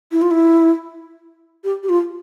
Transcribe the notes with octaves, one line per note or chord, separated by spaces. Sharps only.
E4
F4
E4
G4
G4
F4